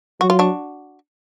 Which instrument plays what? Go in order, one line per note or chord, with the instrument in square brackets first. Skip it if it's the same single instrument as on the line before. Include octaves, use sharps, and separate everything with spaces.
[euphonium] F#3 [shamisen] F#4
[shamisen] F4
D4 F#4